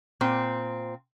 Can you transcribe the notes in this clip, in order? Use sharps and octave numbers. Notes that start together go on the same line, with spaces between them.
A#2 C4